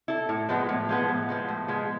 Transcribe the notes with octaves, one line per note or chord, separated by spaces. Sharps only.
E4 A4
A2
F3 G#3 B3
A2
F3 G#3 B3
A2
F3 G#3 B3
A2
F3 G#3 B3